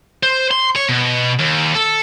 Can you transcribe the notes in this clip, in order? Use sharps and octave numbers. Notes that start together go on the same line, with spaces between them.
C5
C6
C#5
B2
D#2
A4